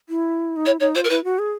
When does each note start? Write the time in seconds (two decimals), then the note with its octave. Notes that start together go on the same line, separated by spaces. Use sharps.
0.09 E4
0.57 D#4
0.66 E4 C#5
0.80 D#4 C#5
0.95 F4 C5
1.04 A#4
1.10 E4 B4
1.24 F#4
1.39 G#4